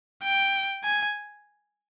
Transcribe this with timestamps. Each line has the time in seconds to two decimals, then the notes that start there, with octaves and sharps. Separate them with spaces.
0.23 G5
0.84 G#5